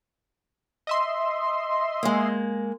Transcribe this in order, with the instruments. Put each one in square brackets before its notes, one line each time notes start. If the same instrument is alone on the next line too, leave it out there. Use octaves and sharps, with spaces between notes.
[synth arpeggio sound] D#5 E5 C6
[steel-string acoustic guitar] G#3 A#3